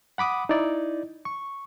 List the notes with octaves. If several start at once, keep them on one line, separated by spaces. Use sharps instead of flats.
F#5 B5 D6 D#6
D#4 E4 D5
C#6